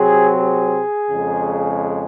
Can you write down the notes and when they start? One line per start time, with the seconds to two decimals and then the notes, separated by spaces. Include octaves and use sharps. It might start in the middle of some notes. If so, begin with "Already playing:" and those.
Already playing: C3 F#3 C4 G#4
0.38 G#4
1.11 F2 C#3 G#3